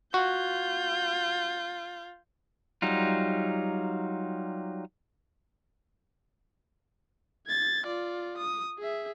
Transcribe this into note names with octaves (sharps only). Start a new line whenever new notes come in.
F4 F#4 G6
F#3 G3 D#4 F4
G#6 A6
F4 D5
D#6
G#4 E5